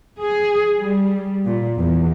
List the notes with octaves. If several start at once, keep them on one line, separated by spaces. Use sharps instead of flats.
G#4
G3
A#2
E2